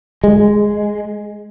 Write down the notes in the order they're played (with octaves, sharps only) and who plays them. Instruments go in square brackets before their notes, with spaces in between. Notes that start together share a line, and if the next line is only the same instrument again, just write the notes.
[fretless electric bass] G#3